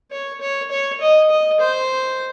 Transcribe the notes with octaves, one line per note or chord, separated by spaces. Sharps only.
C#5
C#5
C#5
D#5
D#5
C5